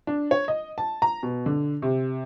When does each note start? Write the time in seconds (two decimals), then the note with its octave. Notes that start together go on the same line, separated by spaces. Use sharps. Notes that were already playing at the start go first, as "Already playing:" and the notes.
0.07 D4
0.31 C#5
0.48 D#5
0.78 A5
1.02 A#5
1.23 B2
1.46 D3
1.82 C3